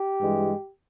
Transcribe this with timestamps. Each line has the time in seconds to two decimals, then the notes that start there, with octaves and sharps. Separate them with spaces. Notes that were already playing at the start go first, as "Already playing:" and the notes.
Already playing: G4
0.20 G2 E3 G#3